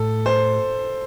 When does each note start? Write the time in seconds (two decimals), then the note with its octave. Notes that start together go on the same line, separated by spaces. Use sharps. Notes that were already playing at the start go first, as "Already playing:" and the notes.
Already playing: A2 A4
0.26 C5